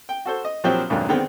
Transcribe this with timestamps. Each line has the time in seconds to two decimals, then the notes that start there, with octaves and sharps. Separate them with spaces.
0.09 G5
0.25 F#4 A4 C5
0.45 D#5
0.64 A#1 F3 F#3 C4 G4 C5
0.90 B1 F2 G#2 D3 D#3 F#3
1.08 D3 D#3 G#3 B3 C4